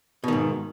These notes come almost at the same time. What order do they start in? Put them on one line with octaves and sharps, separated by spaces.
B2 D#3 G#2